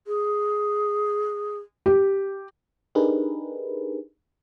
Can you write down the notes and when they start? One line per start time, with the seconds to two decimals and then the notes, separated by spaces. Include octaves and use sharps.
0.07 G#4
1.86 G4
2.95 D4 D#4 G4 G#4 A#4 B4